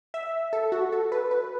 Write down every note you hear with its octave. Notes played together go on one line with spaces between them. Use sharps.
E5
A4
F#4
A4
B4
B4